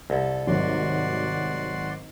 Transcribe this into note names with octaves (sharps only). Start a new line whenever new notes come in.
C2 A4
G#1 F#3 F#4 D5 C6